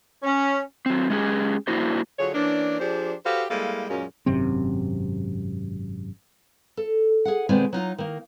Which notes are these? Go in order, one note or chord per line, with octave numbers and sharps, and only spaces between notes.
C#4
F#3 C4
G#3 C#4 G4 G#4
A#3 D4 E4 F#4 C5
D3 F#3 F4 G#4 C#5
E3 A#3 C#4 D4
F3 D4 G4 G#4 C5 D5
F#4 G4 A4 B4 C5 F5
G3 G#3 A#3 E4 A4 F5
F#2 A#2 F#3 G#3 A#3 C#4
G#1 F#2 C3 C4
A4
G#4 F#5
B2 D#3 G#3 C4 D5 G#5
F#3 D#4 F4
D#3 A#3